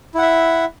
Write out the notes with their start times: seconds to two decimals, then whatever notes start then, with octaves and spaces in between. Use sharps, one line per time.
0.15 E4
0.18 F#5
0.22 E5